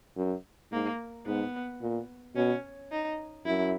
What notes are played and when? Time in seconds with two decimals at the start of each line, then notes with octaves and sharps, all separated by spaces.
0.17 F#2
0.72 G#2 A#3
1.26 G#2 B3
1.82 A#2
2.36 B2 C#4
2.91 D#4
3.45 F#2 E4